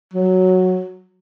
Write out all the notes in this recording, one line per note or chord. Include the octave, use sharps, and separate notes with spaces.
F#3